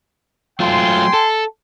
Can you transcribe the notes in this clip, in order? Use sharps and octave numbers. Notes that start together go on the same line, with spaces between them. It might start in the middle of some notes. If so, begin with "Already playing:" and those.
F#3 A3 F4 G5 G#5 C6
A4